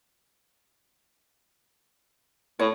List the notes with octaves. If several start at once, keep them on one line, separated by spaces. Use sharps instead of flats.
A2 C#5